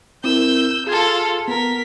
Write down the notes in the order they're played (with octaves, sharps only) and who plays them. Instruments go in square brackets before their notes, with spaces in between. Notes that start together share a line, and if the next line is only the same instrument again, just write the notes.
[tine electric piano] C4 E4 A#4 [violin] E6 G6
[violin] F4 A4 [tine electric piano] G#4 G#6
[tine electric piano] B3 [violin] A#4 B6